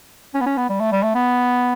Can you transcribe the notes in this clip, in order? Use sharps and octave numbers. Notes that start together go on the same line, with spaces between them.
C#4
B3
C#4
B3
G3
A3
G3
A3
B3